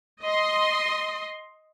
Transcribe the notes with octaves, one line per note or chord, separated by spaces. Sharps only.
D#5 C6